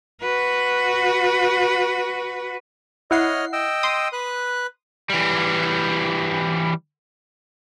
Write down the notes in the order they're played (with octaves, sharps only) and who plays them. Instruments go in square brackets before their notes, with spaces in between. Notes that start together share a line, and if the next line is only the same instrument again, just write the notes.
[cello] F#4 B4
[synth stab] E4 F#5 C7 [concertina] C#5 D#5 F6
[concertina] D#5 G5 E6
[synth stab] C6 D#6
[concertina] B4 F#6
[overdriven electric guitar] E3 G3